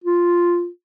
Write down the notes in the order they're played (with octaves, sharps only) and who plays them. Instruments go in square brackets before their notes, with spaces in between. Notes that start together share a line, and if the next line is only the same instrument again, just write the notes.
[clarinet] F4